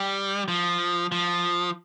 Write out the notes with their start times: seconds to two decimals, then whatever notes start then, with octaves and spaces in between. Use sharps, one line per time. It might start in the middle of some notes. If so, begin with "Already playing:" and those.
Already playing: G3
0.48 F3
1.12 F3